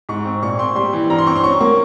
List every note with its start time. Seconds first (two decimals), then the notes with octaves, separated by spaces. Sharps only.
0.09 G#2 C#6
0.25 C4
0.42 A#2 C#6
0.59 C4 C6
0.75 G3 C6
0.93 E3
1.10 G2 A#5
1.18 C6
1.27 C4 C#6
1.36 C6
1.44 C#4 C#6
1.61 A#3